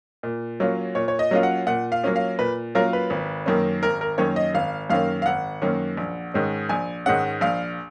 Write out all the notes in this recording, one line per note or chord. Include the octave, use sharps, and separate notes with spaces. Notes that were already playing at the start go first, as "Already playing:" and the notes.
A#2
F#3 A#3 C#4 F4
A#2 C#5
C#5
D#5
F#3 A#3 C#4 F4
F#5
A#2 F#5
F5
F#3 A#3 C#4 F4
F5
A#2 B4
F#3 A#3 C#4 F4 A#4
B4
G#1
F#2 D#3 A#3 C#4
G#1 A#4
A#4
F#2 D#3 A#3 C#4 C#5
D#5
G#1 F5
F#2 D#3 A#3 C#4 F5
F5
G#1 F#5
F#2 D#3 A#3 C#4
A#1
G#2 D#3 G#3 C#4
A#1 G#5
G#2 D#3 G#3 C#4 F#5
A#1 F5